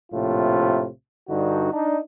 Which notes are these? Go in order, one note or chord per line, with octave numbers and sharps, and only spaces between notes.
A#1 A2 C3 F4
G2 D3 D#4 F#4
D4 D#4